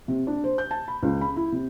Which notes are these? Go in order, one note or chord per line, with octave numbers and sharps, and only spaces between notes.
C3
D4
C5
G6
A5
B5
C#2
B5
E4
C3